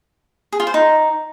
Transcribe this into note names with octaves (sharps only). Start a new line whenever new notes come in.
G#4
F4
C5
D#4